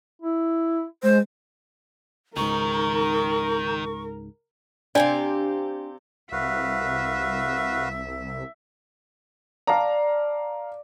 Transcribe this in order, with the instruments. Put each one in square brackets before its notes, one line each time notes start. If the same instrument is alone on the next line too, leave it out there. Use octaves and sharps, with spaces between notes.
[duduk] E4
[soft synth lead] G#3 [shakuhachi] C5
[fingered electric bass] C#2 G#2 [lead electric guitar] D#3 [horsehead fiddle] A#4 [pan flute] C#6
[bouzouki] C3 G4 F5 [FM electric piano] D4 [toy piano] D5 [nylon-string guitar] G5 G#5
[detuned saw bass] C2 [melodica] F#4 B4 F5 [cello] E5
[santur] D5 [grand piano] F5 A5 A#5